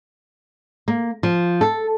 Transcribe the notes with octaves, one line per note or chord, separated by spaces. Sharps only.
A#3
F3
A4